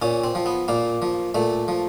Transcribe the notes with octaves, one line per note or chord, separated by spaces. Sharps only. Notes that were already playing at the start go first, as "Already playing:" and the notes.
A#2 C#4
C4
F3
B3
A#2 A#3
F3
A#2 A3
F3